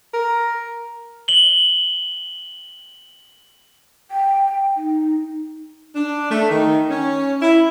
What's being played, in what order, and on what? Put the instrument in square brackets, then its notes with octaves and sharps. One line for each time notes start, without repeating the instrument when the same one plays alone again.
[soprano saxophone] A#4
[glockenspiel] F#7 G7
[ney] G5
D#4
[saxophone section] D4
A3
D#3
C#4
E4